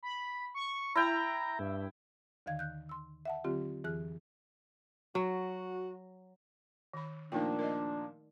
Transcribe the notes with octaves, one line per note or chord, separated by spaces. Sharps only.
B5
C#6
E4 E5 G5 A#5
G2
D#2 D3 D#3 F5 G#6
F#6 G6
C6 E6
E5 F#5 A5
D3 F#3 C4 F4 G4
F2 E3 G#4 F6 F#6
F#3 F#4
D#3 B5
A#2 F3 A3 A#3 D4 D#4 G5
A#4 D5 D#5